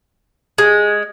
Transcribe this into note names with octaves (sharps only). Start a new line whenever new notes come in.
G#3